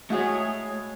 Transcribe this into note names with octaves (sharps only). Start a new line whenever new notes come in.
G#3 A3 F#4 G#4 C#5